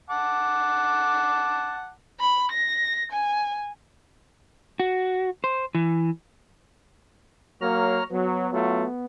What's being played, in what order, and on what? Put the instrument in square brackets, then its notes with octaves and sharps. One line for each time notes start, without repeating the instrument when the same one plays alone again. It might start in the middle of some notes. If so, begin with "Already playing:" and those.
[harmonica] F#5 A5 D6
[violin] B5
A#6
G#5
[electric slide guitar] F#4
C5
E3
[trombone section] F#3 A#3 [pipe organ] C#5 A#5 F6
[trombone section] F#3 [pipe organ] B3
[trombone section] F#3 A3 F4